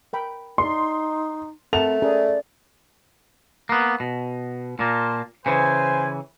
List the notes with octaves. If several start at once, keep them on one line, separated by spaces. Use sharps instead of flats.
A#4 G5 B5
D#4 D5 C6
A3 C4 A#4 F#5 A5 F7
C#4 G#4 A#4 D5
A#3 B3
B2
A#2 A#3 F4 A5
C#3 E3 B4 C5 G#5